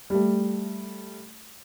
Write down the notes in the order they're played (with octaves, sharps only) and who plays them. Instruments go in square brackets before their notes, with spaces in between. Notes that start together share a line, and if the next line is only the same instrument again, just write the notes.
[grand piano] G3 A3